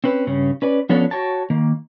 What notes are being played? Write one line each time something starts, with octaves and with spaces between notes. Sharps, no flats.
C4 C#4 B4
G2 C#3 C#4
C#4 B4 D5
F3 B3 C#4 D4 A4 C#5
F#4 C#5 G5 A5
D#3 A#3